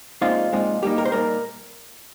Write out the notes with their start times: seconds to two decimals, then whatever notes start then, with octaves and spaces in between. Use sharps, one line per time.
0.21 A#2 F3 G#3 C4 D#4 F4
0.52 A#2 F3 G#3 C4 D#4
0.83 A#2 G3 A#3 D#4 G4
0.98 A#4
1.05 C5
1.12 A#2 G3 A#3 D#4 A#4